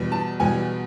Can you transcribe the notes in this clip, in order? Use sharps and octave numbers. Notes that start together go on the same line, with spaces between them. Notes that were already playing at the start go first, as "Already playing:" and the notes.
Already playing: E2 B2 G3 B3
A5
E2 B2 G3 B3 G#5